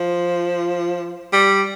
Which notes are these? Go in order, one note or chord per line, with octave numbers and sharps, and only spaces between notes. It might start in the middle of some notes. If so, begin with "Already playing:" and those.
Already playing: F3
G3